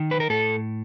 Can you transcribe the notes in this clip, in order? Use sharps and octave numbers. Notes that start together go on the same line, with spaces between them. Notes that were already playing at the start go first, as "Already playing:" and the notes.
Already playing: D#3
B4
A#4
A2 A4